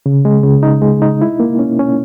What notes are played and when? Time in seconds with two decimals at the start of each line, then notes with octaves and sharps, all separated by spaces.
0.06 C#3
0.25 G#3
0.44 C#3
0.63 D#4
0.82 G#3
1.02 D#4
1.22 E4
1.40 A#3
1.59 C#4
1.79 C#4